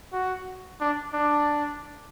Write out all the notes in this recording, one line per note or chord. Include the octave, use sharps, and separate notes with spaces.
F#4
D4
D4